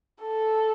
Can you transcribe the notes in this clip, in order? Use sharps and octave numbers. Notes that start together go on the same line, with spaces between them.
A4